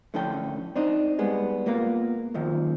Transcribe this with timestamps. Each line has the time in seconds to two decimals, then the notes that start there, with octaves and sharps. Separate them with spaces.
0.14 A2 D3 F3 C#4 A4 G5
0.76 C4 D4 D#4
1.18 G3 G#3 B3
1.66 A#2 A#3 B3 A#4 F5
2.34 F#2 A#2 D#3 F3